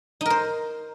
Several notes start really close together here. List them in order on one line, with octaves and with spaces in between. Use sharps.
D#4 A#4 C5